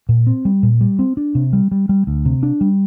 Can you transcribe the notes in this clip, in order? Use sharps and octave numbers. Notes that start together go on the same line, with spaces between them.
A#2
C4
G3
A#2
G3
C4
D4
C3
G3
G3
G3
D2
C3
D4
G3